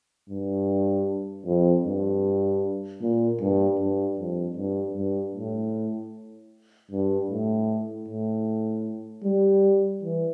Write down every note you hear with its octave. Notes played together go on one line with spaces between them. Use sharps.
G2
F2
G2
A#2
G2
G2
F2
G2
G2
A2
G2
A2
A2
G3
E3